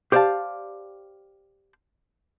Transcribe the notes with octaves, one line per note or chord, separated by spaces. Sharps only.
G4 C5 D5 E5 F5 A5